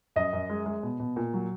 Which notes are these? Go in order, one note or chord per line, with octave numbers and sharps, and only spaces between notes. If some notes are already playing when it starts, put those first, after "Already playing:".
F#2 D#5
F#2
G#3
G#3
B2
B2
A#2
F#3